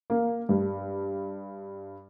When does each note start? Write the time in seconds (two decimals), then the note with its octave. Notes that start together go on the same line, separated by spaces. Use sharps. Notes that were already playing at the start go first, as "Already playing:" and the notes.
0.10 A#3
0.49 G2